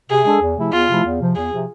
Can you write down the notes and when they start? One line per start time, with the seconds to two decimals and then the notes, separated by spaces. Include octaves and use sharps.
0.10 C3 G#4
0.25 G#3 D4 A4
0.41 E2
0.57 C3 F3 A3 E4
0.73 E2 F4
0.88 C3 F3 A3 E4
1.04 E2
1.20 C3 F3
1.35 E2 G#4
1.51 C3 F3